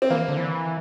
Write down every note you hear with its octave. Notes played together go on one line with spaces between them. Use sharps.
C4
E3 A#3
D3
E3